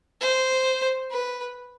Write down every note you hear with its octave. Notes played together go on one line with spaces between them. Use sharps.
C5
B4